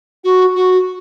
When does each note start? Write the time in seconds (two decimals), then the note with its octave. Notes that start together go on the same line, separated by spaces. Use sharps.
0.24 F#4
0.55 F#4